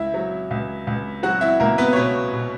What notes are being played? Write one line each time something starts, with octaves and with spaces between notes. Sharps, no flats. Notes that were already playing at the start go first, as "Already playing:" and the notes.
Already playing: C#2 E4 E5
F#3
C#2
C#2
F#3 F#4 F#5
E4 E5
C#2 A#3 A#4
B3 B4
C#5
B2 B3 B4
B2